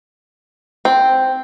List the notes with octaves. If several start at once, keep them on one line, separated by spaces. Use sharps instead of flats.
C4